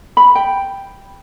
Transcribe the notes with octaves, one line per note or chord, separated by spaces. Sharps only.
B5
G5